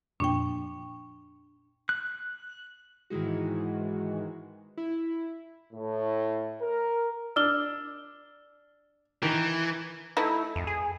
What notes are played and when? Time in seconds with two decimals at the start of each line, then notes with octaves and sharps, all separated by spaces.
0.20 F2 A#2 F3 D4 G5 C#6
1.89 F#6
3.10 G#2 D#3 E3 G#3 F#4
4.77 E4
5.73 A2
6.61 A#4
7.36 D4 E6 F6 G7
9.23 D#3 E3 B6 D7
10.17 A3 D#4 E4 B4
10.56 F2
10.67 G#4